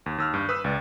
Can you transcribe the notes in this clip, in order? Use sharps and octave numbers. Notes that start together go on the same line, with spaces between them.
D#2
D#2 E6 F6
G2
B4 D#6 E6
C#2 D5